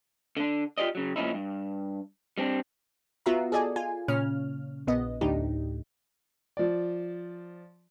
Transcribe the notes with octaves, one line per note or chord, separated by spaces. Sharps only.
D3 D4
F4 G4 G#4 D5 D#5
C#3 F#3
A#2 F3 C#4 D#4 E4
G2
G3 C4 D4
B3 F4 F#4 E5 A#5
G#4 A4 D5 D#5 G#5
F4 G#5
A#2 C#3 C#4 F6
A#1 B3 D#5
D2 A2 D4 D#4 G4
F3 D5